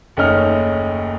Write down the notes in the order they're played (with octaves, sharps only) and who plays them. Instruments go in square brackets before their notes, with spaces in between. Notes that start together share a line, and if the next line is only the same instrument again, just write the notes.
[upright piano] F#1 D#2 A3 C#4 D#4 F6